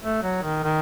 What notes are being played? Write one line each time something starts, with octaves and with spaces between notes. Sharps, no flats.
A3
F#3
D#3
D#3